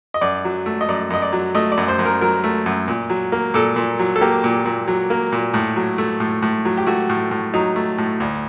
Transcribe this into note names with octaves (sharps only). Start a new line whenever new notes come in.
D#5
F#2 D5
F#3
A3
D#5
F#2 D5
F#2 D#5
D5
F#3
A3 D#5
D5
F#2
C5
F#2
A#4
F#3 A#4
A3
F#2
A#2
F#3
A#3
A#2 A4
A#2
F#3
A4
A#3 G4
A#2
A#2
F#3
A#3
A#2
A2
F#3
A3
A2
A2
F#3
G4
A3 F#4
A2
A2
F#3 D#4
A3
A2
D2